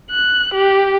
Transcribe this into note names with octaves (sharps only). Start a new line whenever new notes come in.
F#6
G4